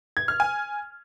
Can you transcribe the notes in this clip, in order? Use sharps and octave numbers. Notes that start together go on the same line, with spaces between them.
G#6
F6
G#5